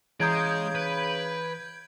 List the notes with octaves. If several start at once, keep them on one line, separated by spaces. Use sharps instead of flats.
C#3 E3 G#3 A#5 D#6 G6 G#6 D7
B4